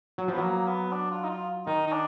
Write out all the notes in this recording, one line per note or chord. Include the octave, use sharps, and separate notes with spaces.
F#3
F3 B3
F#3 A#3
B3
D4
F4
D#4
F4
D#3 D#4
D#4
D4